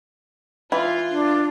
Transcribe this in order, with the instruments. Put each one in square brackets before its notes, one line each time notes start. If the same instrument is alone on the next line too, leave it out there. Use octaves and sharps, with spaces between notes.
[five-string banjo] E3 [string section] F4
[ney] D4